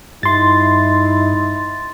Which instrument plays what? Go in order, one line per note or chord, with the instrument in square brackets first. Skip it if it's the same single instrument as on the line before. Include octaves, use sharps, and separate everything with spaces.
[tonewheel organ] G2 [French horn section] D#4 E4 [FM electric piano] C6 A6